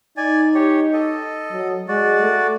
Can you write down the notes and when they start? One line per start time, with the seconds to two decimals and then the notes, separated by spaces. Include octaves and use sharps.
0.17 D#4 D5 G#5
0.55 G4 C#5
0.93 A4 D#5
1.52 F#3
1.88 G#3 F#4 D5
2.22 A3